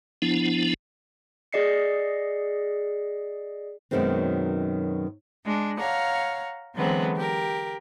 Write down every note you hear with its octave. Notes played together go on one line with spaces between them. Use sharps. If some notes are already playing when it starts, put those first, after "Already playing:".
F3 B3 D4 E4
G#4 D5 D#5 C7 C#7
F#2 B2 D#3 F#3 G#3 C4
G#3 D4
C#5 F5 F#5 A#5
D3 E3 F#3 G#3 B3 C4
G4 A#4